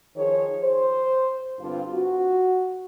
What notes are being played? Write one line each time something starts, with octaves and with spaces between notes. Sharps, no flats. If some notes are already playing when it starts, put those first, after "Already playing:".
D#3 F3 G#4 C#5
C5
G2 D3 C4 F4
F#4